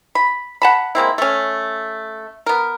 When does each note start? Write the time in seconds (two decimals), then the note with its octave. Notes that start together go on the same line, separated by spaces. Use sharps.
0.15 B5
0.62 F#5 A5 B5
0.95 G#3 A#3 C4 E4
1.18 A3 C#4
2.46 B3 A#4